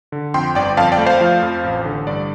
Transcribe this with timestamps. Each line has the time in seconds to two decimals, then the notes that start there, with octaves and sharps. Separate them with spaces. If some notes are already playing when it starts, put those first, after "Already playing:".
0.12 D3
0.34 F2 G5 C6
0.55 G1 D5 G5
0.77 F2 F5 A5
0.92 D5 G5
0.98 A3
1.06 C5 F5
1.21 F3
1.42 F2
1.64 A1
1.85 D3
2.07 G2 D5